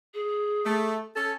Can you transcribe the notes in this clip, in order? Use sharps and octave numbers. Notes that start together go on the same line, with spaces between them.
G#4
A3
C#4 A4